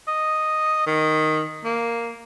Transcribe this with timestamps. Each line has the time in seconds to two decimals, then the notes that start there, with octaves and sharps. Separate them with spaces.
0.08 D#5
0.86 D#3
1.64 A#3